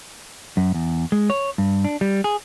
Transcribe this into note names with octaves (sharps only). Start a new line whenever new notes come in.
F#2
E2
G#3
C#5
G2
D4
G3
G#4